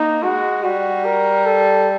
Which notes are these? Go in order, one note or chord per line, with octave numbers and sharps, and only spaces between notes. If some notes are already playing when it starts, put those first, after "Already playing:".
Already playing: A#3 D#4
G#3 F#4
G3 F#4
A#4
A4